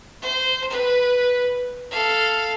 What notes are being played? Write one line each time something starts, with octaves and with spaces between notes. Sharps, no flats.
C5
B4
A4 F5